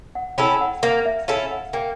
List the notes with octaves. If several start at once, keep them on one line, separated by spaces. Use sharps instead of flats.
F#5
C#4 E4 A4 G5
F#5
A#3 F5
E5
C#4 E4 A4 F5
F#5
A#3 G5